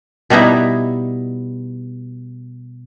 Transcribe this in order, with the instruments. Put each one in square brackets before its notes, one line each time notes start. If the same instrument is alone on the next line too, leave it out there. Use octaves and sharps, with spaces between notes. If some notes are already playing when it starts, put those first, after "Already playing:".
[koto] B2 G3 B3 D#4 E4